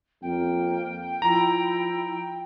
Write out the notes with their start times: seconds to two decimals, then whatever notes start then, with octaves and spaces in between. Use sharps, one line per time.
0.22 F2 A#3 G5
1.22 F3 E4 A#5